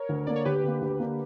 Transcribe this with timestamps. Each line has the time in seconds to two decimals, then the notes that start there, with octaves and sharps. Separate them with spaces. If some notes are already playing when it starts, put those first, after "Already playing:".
Already playing: A#4 C#5
0.09 D2
0.27 D3 A#3 D5
0.36 C#5
0.45 D2 G4 B4
0.64 D3 A#3
0.82 D2
1.00 D3 A#3